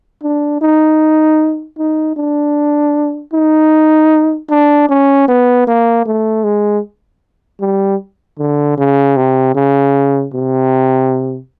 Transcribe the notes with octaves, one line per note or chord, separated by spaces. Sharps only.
D4
D#4
D#4
D4
D#4
D4
C#4
B3
A#3
A3
G#3
G3
D3
C#3
C3
C#3
C3